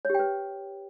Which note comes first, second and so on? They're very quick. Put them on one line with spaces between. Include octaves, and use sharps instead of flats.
C#5 G4 G5 B4